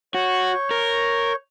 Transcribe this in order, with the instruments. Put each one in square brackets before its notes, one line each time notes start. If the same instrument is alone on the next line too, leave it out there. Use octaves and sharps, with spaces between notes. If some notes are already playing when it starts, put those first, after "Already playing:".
[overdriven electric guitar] F#4 [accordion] C#5 C#6 G6
[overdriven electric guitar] A#4